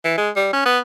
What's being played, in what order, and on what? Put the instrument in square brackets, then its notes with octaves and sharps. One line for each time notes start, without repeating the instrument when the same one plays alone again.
[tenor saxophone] E3
G#3
G3
C#4
B3